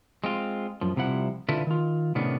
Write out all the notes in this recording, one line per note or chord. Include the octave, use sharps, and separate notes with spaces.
G#3 C4 F4
F#2 F3
C2 C3 F3 E4 F#5
D3 E4 F4 A4 B4
D#3 F4
A2 C3 D#3 B3 C#4 D4